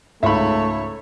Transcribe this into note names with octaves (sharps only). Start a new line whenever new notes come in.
C#2 G#2 A3 C#5 E5 B5